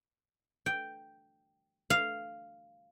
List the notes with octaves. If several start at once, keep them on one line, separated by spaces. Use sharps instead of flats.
G5
F5